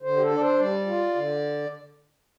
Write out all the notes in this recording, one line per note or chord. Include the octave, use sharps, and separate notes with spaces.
D3 C5
G4
A4
D4 D5
C5
G3 D5
F4
D3